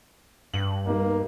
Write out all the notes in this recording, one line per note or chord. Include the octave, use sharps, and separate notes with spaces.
G2 F#7
B1 G3 A#3